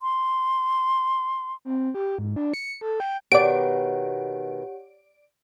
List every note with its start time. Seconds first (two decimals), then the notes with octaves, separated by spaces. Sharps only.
0.01 C6
1.65 C4
1.94 G4
2.18 G#2
2.36 D4
2.54 C#7
2.81 A4
3.00 G5
3.32 B2 D#3 G4 C#5 D5 F#5 D7